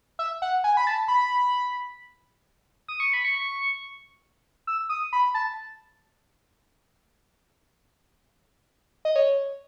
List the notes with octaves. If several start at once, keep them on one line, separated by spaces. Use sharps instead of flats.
E5
F#5
G#5
B5
A5
B5
D#6
C#6
B5
C#6
E6
D#6
B5
A5
D#5
C#5